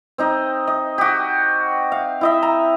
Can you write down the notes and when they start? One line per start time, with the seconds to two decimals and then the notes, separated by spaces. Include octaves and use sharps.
0.18 C4 D#4 D#5
0.67 D#5
0.98 F#4 G4
1.92 F5
2.21 E4 D#5 E5
2.42 A#5